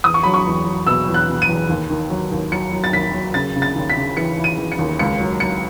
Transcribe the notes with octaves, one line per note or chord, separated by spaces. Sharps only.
E2 D#6
C#6
F#3 B5
C#6
E2
F#3
B2 E6
E2
F#6
B2
D#7
E2
D#2
D#3
F#3
D#2
F#3 C#7
F#3
A6
D#2 B6
F#3
C#3 A6
C#3
A6
D#2
B6
C#3
E3 C#7
E3
D#7
E3
C#7
D#2
C#2 C#7
F#3
F#3 C#7